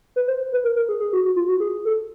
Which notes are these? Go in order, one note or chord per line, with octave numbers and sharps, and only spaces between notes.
B4
C5
B4
A#4
A#4
G#4
G#4
F#4
F#4
F4
F#4
G#4
A4